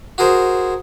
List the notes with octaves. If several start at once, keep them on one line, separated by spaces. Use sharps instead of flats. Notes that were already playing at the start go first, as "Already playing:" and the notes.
F#4 G#4 A#4 C5